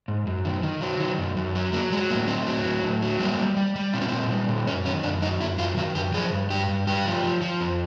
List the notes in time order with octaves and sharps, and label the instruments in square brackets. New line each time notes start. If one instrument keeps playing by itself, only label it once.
[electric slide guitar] G#2
F#2
D#3
D#3
F#3
D#3
F#2
F#2
F#3
F#3 A#3
F#3 G#3
A2 A#3
A2 C4
F#3
A2
A2
F#3
G3 A#3
G3
G3
G3
A#2 C4
C#4
A#2 C4
G3
A#2
F#2 C#4
D#3 C#4
F#2 D4
F#2 D#4
F#2 E4
F#2 F4
D#3 F#4
F#2 G4
F3 G#4
G2
G2 G4
G2
G2 G4
F3
F3
F3
F2